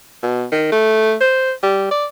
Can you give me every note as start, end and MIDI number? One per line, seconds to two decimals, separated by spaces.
0.22 0.45 47
0.52 0.71 51
0.72 1.14 57
1.21 1.52 72
1.63 1.87 55
1.91 2.06 74